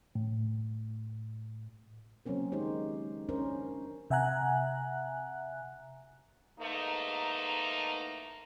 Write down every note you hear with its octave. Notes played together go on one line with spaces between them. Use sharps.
A2
C#3 F#3 A#3 C4 C#4 A#4
D#3 G#3 D#4 G4 C5
C#4 D4 A#4 C5
C3 E5 F#5 G#5 A#5 F#6
E2 G#2 A3 A#3 D#4